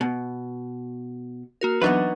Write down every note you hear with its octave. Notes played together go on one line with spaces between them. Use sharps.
B2
A#3 F#4 A#4
E3 F#3 B3 D4 D#4 B4